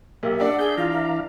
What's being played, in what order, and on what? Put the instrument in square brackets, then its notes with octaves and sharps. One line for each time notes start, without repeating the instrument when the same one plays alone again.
[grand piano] B1 [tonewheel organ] A#3 G4 E5
[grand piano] D4 D5 [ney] F#5
[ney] G#4 [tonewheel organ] E5 G6
[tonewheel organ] E3 F5 A#5 [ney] F4
[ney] E5